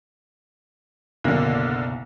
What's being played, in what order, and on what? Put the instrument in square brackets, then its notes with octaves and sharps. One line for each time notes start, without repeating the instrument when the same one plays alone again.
[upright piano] F#1 B1 [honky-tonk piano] D3 A#3